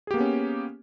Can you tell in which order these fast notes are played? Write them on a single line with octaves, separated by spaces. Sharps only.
G#4 G4 A#3 B3 C#4